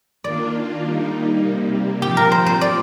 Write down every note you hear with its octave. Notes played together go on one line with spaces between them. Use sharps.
D#3 A#3 D4 F4 D5
G3 A#3 D#4
C3 G3 A#3
A#2 F3 C4 F4 G4
A#4
C5
C5
D5